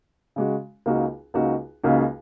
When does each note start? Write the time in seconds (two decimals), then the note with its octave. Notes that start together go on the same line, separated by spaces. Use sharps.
0.36 C#3 G#3 F#4
0.86 C#2 C#3 A#3 D#4 F#4
1.34 C#2 C#3 A#3 D#4 F#4
1.83 C#2 C#3 A#3 D#4 F#4